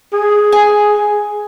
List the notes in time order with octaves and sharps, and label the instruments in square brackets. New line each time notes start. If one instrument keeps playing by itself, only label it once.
[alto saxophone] G#4
[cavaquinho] G#5